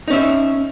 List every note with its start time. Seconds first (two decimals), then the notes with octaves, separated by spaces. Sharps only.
0.08 D#4
0.10 C#4
0.13 E5